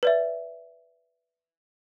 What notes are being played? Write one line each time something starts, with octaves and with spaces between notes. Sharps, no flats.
B4 D5 E5